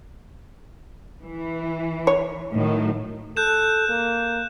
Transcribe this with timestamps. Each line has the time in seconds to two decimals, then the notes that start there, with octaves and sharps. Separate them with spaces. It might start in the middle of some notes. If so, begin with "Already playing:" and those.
1.22 E3
2.07 C#5
2.53 A2 D#3 F#3
3.37 A4 F#6 G6 E7
3.89 A#3